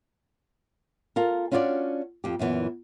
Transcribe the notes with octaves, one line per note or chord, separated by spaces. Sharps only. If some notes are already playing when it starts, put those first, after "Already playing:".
F4 A4 A#4
C#4 D4 F4 F#4 C#5 D5
F2 G4
F#2 A#2 E3 B3